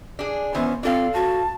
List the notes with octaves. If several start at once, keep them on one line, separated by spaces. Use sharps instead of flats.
D4 G#4
E3 B3 C#4 C5
C4 D4 F4 A4 F5
F#4 A5